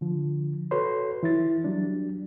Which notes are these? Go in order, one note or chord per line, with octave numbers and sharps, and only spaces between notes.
D3 F3
F#4 A4 B4 C#5 C6
E3 E4 A6
F#3 G3 D4